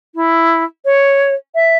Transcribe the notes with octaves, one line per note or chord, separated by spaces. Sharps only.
E4
C#5
E5